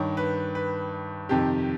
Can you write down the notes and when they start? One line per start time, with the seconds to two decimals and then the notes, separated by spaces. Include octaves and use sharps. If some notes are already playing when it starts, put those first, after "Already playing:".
Already playing: G2 D#3 C#5
0.17 B4
0.55 B4
1.29 F2 C3 D#3 G4